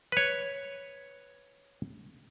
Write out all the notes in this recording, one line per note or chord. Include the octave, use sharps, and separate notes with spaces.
B4 C#5